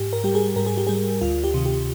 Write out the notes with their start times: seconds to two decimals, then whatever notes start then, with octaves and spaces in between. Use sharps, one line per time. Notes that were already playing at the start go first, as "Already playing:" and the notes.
Already playing: G#2 G4
0.13 A#4
0.24 G3 G4
0.35 G#4
0.56 G#2 A#4
0.66 G#4
0.77 G4
0.87 G3 G#4
1.22 D2 F4
1.44 G4
1.54 C3 D#3
1.66 G4